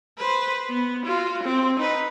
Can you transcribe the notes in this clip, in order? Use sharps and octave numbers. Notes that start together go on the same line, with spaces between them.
B4 C5
B3
F4 F#4
C4
D#4 B4